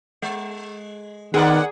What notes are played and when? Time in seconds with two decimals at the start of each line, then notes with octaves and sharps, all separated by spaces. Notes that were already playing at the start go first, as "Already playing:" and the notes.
0.22 G#3
1.34 D#3 B3 G#4 A#4 D5 F#5